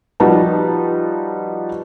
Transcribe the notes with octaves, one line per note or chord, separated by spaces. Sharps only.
F3 G3 D#4 F#4 B4 A5